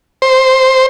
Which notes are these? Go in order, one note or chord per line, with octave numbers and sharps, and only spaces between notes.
C5